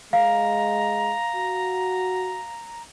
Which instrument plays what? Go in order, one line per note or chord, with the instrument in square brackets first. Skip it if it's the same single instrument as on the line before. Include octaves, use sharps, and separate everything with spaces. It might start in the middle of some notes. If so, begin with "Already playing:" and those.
[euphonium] G#3 [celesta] F5 [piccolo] A#5
[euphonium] F#4